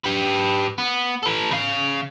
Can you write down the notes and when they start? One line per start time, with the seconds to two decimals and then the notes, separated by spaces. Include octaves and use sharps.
0.04 G4 B4
0.78 B3
1.23 A4 B4
1.51 C#3 F5